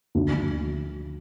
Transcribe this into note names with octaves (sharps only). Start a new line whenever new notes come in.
D2
D2